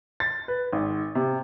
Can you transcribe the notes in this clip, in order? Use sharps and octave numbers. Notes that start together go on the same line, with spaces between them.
A6
B4
G#1
C3